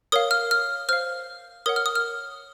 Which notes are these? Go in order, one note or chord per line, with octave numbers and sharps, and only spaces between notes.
A#4 C#5 F5 D#6
F6
F6
C5 F5 F6
A#4 C#5 F#5 D#6
F6
D#6
F6